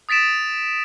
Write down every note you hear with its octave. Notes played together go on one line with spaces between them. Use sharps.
D#6 A6 B6 D7 E7